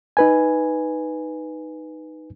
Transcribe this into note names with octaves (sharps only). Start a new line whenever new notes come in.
D#4 B4 G#5